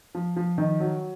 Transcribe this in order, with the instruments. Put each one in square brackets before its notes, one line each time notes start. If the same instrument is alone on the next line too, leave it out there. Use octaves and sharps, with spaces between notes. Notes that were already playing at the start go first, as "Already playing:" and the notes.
[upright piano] F3
F3
D#3
F#3